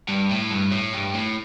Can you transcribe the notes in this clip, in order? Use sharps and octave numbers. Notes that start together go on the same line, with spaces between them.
G2
A2
G2
A2
G2
A2